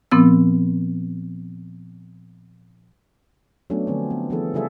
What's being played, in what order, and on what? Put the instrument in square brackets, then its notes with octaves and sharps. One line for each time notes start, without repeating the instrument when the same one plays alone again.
[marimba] A#2 F3 B3 C4 E6
[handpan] F#3 A3 B3 C#4 D4
D3 F3 A3 C4
B3
E3 F3 B3 E4 G#4 A4
C#3 G3 F4 G#4 A4 E5